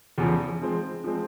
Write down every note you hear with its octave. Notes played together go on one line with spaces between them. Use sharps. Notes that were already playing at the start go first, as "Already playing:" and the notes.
E2 C#3 F3
F3 G#3 C4
F3 G#3 C4